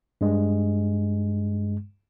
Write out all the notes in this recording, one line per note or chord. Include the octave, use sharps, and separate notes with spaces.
G2 G#3